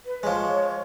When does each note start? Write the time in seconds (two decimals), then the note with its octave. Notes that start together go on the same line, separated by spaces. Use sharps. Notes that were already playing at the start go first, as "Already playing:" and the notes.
0.06 B4
0.23 F3 G#3 C#5